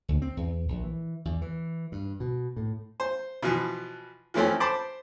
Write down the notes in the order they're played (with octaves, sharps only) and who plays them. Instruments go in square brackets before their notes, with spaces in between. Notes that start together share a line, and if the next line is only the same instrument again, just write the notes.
[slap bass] D2
C4
E2
A#1
E3
E2
E3
G2
B2
A2
[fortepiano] C5
B2 E3 F3
E3 F3 A3 C4 C#4
C5 A5 B5 D6